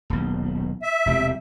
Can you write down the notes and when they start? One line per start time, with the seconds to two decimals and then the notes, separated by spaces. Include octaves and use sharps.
0.10 D#1 B1
0.82 E5
1.06 E1 C3 G3